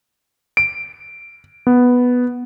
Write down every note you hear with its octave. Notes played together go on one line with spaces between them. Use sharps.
D7
B3